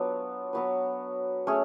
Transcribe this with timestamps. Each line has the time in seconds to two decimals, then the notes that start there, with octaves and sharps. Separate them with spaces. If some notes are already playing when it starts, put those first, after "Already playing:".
Already playing: F#3 B3 D4 F4
0.53 F#3 B3 F#4 B4
1.47 A3 C#4 G#4 C#5